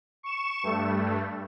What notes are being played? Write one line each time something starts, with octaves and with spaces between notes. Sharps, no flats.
C#6 E7
G2 A3